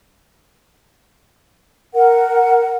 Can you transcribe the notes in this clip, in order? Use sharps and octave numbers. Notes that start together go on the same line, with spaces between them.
A#4 F#5